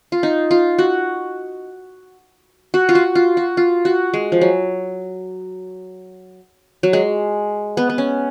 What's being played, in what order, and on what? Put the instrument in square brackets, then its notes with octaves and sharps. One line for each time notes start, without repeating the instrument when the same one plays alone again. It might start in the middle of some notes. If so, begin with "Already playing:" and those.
[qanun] F4
D#4
F4
F#4
F#4
F4
F#4
F4
F#4
F4
F#4
G#3
F3
F#3
F#3
G#3
B3
B3
C#4